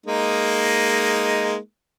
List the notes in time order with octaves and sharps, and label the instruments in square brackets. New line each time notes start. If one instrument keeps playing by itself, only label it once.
[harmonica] G#3 A#3 D#4